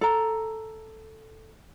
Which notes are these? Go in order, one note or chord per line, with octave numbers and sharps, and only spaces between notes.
A4 A#5